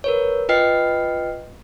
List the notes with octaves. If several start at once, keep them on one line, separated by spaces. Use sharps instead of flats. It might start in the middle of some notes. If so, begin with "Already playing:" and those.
A#4 B4 C#5
F4 B4 D#5 G5 F6 C7